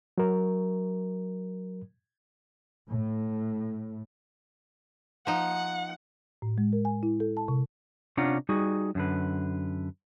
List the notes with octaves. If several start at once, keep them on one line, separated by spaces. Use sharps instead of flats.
F#3 A#4
A2
F3 D#4 F#5
A2
G#3
A#4
G#5
E4
A4
A5
C3
C3 C#4 D4 F4 F#5 A#5
G3 D#4 F#4 G#4
F#2 D3 B4